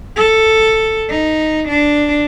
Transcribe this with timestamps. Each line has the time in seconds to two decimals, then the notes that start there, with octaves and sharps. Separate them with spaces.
0.16 A4
1.09 D#4
1.68 D4